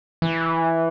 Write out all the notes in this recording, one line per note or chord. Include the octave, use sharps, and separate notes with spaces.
E3